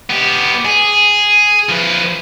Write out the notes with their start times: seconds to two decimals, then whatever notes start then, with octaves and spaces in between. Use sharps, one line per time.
0.10 B3 G4
0.65 G#4
1.69 F3 B4